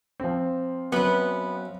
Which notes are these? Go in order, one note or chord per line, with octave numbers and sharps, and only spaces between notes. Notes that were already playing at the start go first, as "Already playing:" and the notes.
F3 C4
F#2 B3 B4